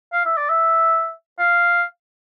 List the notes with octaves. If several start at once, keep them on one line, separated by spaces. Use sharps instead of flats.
F5
E5
D5
E5
F5